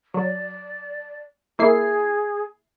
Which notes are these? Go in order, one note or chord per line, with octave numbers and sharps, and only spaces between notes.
F#3 D5
A#3 E4 G#4 C7